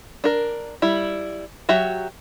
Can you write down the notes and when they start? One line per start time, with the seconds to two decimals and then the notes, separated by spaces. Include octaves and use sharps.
0.24 D4 A#4
0.82 G3 E4
1.69 F#3 F#4 G4 E5